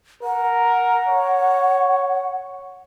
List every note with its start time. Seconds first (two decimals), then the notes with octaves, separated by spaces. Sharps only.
0.23 A#4 F#5
1.08 C#5